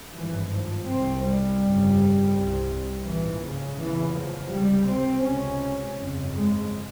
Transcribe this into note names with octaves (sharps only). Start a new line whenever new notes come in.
G#1 G2 E3
F3
C2 C3 C4
G3
G1 F2 C#3
C2 C3
A#1 G#2 E3
C#3
F1 E2 C#3 E3
F3
C#2 C3 G3
C4
C#2 C3 C#4
G1 F2 C#3
G#3